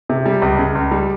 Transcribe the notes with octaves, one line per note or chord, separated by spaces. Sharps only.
C3
G3
C#2
C#3
C#2
G3